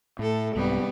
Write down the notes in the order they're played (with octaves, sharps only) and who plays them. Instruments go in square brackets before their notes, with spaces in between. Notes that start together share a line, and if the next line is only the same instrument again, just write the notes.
[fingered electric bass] A2 [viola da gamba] A3 A4
[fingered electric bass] C2 G#2 C3 [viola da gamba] G3 B3